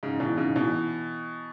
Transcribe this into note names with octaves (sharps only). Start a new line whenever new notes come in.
G#2 C#3
B2 E3
G#2 C#3
B2 E3